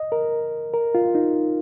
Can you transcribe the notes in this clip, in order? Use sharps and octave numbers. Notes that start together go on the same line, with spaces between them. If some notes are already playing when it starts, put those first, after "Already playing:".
Already playing: D#5
A#4
A#4
F4
D#4